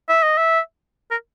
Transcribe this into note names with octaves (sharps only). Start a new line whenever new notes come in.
E5
D#5
E5
A#4